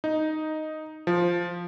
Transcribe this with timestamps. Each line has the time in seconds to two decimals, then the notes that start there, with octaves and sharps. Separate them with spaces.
0.04 D#4
1.07 F3